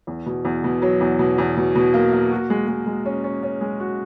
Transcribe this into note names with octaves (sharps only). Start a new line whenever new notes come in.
E2
B2
E2
B2
F#3
E2
B2
E2
B2
B2
A#3
A#3
F#4
G#3
G#3
G#3
C#4
C#4
C#4
G#3
F#4